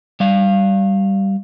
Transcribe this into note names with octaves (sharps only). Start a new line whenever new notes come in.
G3 F5